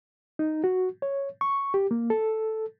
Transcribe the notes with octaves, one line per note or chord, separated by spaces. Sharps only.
D#4
F#4
C#5
C#6
G4
A#3
A4